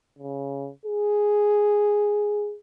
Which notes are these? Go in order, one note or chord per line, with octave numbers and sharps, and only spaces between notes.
C#3
G#4